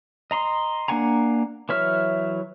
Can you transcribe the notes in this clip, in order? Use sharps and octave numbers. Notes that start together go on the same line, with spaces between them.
D#5 A#5 C6
A#3 D4 F#5 G#5 A#5
E3 F#3 C#5 E5 F6